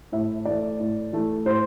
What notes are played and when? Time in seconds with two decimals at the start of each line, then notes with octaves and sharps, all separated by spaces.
0.12 A2 E5
0.45 E3 A3 D5
0.80 A2
1.13 E3 A3
1.45 A2 C5